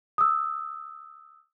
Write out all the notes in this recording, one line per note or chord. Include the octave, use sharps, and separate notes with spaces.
D#6 E6